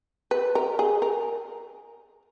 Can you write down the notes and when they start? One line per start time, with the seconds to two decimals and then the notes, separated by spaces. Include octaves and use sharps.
0.31 B4
0.55 A#4
0.79 G#4
1.02 A#4